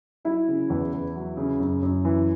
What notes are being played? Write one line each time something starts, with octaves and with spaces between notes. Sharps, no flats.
F#3 E4
C#3
E2
E2
F#3
C#3
F#2
F#2
E3